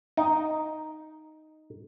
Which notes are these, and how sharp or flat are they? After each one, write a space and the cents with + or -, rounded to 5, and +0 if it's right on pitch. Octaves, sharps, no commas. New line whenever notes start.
D#4 +0 G5 +0